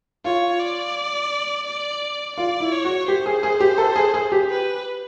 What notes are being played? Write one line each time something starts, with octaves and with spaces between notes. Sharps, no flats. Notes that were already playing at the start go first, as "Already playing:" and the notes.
F4 C#5
D5
D5
F4 D5
E4
C#5
F#4
G4 C5
G#4
G#4
G4
A4
G#4
G#4
G4
B4